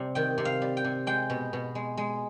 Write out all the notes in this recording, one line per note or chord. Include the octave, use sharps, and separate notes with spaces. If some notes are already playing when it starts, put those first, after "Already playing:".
Already playing: C3 G3
D#3 G5
C3
F5
G3
G5
C3
G#3 G5
B2
B2
G#3
G#3